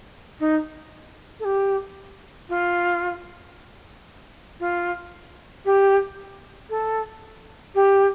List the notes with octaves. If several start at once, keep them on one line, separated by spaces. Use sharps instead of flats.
D#4
A4
G4
F4
F4
G4
A4
G4